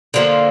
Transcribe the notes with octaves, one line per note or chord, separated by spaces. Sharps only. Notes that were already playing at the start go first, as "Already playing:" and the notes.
D3 F3 A#3